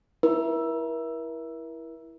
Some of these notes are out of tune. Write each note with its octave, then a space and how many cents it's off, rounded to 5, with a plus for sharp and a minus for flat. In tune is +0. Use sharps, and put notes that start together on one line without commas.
E4 +0 A#4 +40